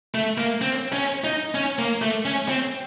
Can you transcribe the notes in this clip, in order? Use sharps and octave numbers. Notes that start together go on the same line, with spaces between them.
A3
A#3
C4
C#4
D#4
C#4
A#3
A3
C#4
C4